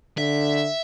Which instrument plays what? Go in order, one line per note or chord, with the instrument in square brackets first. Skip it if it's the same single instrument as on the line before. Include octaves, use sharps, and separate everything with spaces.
[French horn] D3 [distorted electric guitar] E5